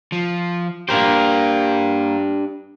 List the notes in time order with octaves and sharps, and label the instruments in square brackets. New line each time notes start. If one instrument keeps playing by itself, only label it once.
[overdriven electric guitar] F3
[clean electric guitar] A#3 A#4 C5 [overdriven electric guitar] D4 G4